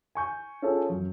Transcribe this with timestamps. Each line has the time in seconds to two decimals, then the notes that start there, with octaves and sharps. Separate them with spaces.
0.15 G#5 C#6 G6
0.62 C#4 F4 G#4 A4 C#5
0.89 F#2 F#3